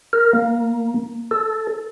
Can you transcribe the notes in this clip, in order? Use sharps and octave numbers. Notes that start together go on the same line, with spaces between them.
A#4
A#3
A4